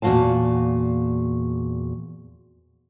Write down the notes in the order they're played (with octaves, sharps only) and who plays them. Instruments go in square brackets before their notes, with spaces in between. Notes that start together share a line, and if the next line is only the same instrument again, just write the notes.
[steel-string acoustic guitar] E2 A#2 B3 F#4 F5 A5